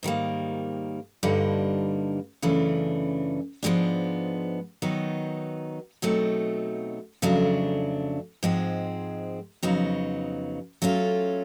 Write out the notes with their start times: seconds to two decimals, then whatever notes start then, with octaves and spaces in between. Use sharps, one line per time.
0.03 G#2 D#3 G3 A#3
1.23 G2 D3 G3 A#3 D#4
2.42 F#2 C#3 E3 A3 D4
3.63 G#2 F3 G#3 B3 D4
4.82 D#3 F#3 B3 D#4
6.02 B2 F#3 A3 C4 D#4
7.22 F2 C#3 F#3 A3 D4
8.43 G#2 F3 G#3 C4
9.63 F2 C#3 F#3 B3 D#4
10.82 F#3 A3 C#4 F4